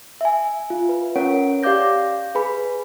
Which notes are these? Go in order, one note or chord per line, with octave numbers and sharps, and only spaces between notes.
E5 G#5
F4
B4
C#4 A#4 C#5 F#5 D7
G4 D5 F5 D6 G6 A#6
G#4 B4 B5